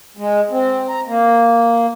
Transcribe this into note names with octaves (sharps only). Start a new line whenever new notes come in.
G#3
C4
A#5
A#3